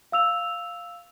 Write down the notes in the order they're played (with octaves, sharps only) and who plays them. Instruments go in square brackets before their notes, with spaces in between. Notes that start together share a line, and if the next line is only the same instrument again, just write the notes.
[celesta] F5 E6 F7